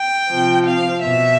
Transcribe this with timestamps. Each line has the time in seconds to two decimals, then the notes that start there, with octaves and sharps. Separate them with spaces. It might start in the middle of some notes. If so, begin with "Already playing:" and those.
Already playing: G5
0.29 C3 F3
0.66 F5
1.03 B2 E5